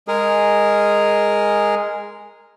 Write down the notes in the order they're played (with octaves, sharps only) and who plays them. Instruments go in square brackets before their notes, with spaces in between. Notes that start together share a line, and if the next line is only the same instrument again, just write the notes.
[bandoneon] G#3 G#4 A#4